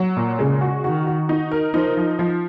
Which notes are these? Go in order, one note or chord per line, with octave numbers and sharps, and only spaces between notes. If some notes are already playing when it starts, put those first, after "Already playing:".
Already playing: F#3
A#2
C#3 G#3
F#4
D#3 F#4
F#4
D#4
A#4
F3 D#4
F3
F3